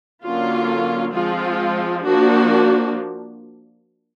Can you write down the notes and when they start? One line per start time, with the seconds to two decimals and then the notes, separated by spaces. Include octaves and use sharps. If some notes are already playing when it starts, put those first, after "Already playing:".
0.24 D3 F#3 A#3 C#4 F4
1.14 F3 G#3 C4 F4
2.05 F3 A#3 D4 F#4